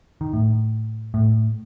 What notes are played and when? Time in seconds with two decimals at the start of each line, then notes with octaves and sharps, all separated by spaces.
0.21 D#3
0.33 A2
1.14 A2